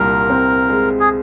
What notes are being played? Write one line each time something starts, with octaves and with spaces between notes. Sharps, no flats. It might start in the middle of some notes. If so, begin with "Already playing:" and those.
Already playing: C2 A#2 A#3 A#4
C4
G#3
G#4